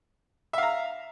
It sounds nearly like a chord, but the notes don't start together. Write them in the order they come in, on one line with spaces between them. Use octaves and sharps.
E5 F5 A#5